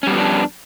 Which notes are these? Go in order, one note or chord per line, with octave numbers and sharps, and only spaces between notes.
F3 G3 B3 C#4 D4